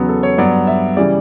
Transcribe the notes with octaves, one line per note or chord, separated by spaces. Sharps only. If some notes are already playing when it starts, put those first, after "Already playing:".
Already playing: E2 C#3 F#3 B3 F#4
A4
C#5
G2 F#3 B3 D5
E5
C#3 E3 G3 D5